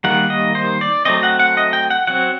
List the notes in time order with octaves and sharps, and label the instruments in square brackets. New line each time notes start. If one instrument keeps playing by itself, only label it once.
[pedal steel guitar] D#3 G3 A#3 F#5
D#5
C5
D5
F#3 A3 C4 D#5
F#5
F#5
D#5
G5
F#5
F#3 C4 F#5